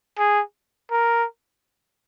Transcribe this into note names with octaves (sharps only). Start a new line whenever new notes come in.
G#4
A#4